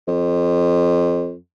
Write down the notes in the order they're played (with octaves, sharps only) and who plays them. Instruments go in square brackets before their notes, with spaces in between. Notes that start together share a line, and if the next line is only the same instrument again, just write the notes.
[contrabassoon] F2